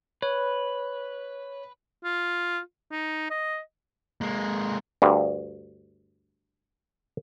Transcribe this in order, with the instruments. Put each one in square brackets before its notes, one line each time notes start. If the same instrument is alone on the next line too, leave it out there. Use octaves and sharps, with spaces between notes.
[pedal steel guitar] B4 [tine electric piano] C#5
[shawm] F4
D#4
D#5
[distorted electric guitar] G#3 A#3
[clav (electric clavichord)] D2 G2